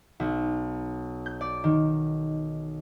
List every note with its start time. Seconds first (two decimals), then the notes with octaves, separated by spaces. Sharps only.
0.20 B1
1.26 G6
1.41 D5
1.64 D#3